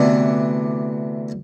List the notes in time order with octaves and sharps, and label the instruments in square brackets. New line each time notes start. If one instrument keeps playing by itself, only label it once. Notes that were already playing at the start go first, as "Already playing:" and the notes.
Already playing: [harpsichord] D2 C3 E3 B3 D4